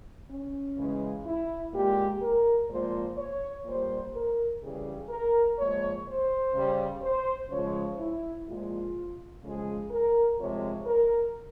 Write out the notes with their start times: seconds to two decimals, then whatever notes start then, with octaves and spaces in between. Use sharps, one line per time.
0.28 C#4
0.77 C#3 E3 G#3
1.25 E4
1.73 A#2 G#3 G4
2.21 A#4
2.69 A#2 F3 G#3 C5
3.17 C#5
3.65 A#2 G3 C5
4.13 A#4
4.61 C#3 E3 G3 G#4
5.09 A#4
5.57 A#2 F3 G#3 C#5
6.06 C5
6.53 C#3 G3
7.01 C5
7.50 C#3 F3 G#3 C#5
7.99 E4
8.47 A#2 F3 G#3 F4
9.43 C#3 F3 G#3 G#4
9.91 A#4
10.38 C3 F3 G#3 C#5
10.86 A#4